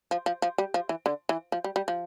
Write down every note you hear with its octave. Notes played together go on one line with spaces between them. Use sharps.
F3
F3
F3
G3
F3
E3
D3
E3
F3
G3
G3
F3